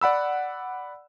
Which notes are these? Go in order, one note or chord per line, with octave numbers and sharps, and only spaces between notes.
D5 F#5 B5 E6